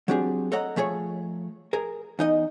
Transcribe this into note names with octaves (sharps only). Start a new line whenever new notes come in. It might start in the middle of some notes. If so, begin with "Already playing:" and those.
F#3 C4 D4 G4 G#4
A4 C#5 D#5 F#5 A#5
F3 A3 G#4 C#5
G#4 A#4
E2 D#4 D#5